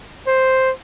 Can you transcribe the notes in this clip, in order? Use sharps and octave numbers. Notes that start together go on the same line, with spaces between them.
C5